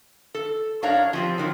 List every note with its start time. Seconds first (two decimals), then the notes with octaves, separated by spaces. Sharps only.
0.35 A4
0.82 F#2 D4 A#4 C#5 F5 A#5
1.13 F3 C4 G4
1.38 A#2 D#3 F#3